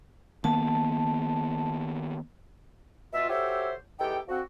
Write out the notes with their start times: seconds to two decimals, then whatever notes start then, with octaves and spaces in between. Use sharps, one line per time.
0.44 D#3 A#3 B3 A5
3.13 B2 F4 E5
3.29 F#4 G4 A4 C5 C#5 E5
3.99 E2 D#4 G4 A4 G5
4.28 D3 F3 C4 F#4